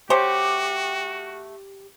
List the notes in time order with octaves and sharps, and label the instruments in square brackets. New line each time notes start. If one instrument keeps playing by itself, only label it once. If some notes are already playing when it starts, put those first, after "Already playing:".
[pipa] A3 C5 C#5 [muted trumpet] F#4 [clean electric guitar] G4